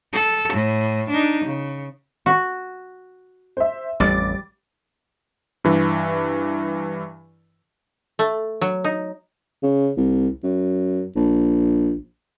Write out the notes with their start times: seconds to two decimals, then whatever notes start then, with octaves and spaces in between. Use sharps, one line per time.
0.13 A4
0.53 A2
1.10 D4 D#4
1.45 C#3
2.26 F#4
3.57 C5 E5
4.00 A1 F2 G3 D6 A6
5.64 G2 E3
8.19 A3
8.61 F#3
8.84 D#4
9.63 C#3
9.97 C2
10.43 F#2
11.16 A#1